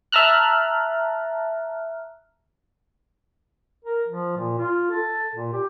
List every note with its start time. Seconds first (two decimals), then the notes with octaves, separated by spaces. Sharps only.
0.12 E5 A5 A#5 F6 F#6
3.85 A#4
4.08 F3
4.37 A#2
4.58 F4
4.91 A4
5.35 A#2
5.53 G4